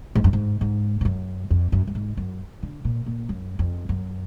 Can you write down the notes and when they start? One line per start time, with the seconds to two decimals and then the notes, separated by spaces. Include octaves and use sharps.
0.15 G#2
0.24 F#2
0.33 G#2
0.61 G#2
1.01 G#2
1.05 F#2
1.50 F2
1.72 F#2
1.87 F#2
1.95 G#2
2.17 F#2
2.63 D3
2.85 A#2
3.06 A#2
3.29 F#2
3.59 F2
3.89 F#2